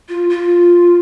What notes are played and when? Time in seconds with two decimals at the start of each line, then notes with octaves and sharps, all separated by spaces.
0.09 F4
0.30 F4